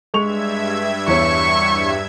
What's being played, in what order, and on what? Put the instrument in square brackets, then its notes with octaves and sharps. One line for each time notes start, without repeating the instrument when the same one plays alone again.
[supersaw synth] G2 E5 G#6 [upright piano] G#3 C#6 F7
[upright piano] E2 C#5 [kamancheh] C#6